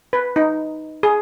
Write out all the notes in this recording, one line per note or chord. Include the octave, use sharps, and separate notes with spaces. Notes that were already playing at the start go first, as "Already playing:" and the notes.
B4
D#4
G#4